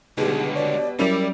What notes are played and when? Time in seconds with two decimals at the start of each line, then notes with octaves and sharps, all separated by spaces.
0.18 C#2 B2 D3 G3 D#4 G#4
0.56 C#5 D5
0.99 F#3 G3 C#4 E4 A#4 D5 F7